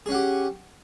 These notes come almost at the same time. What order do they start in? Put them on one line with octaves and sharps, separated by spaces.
G#4 C#4 F#5 G4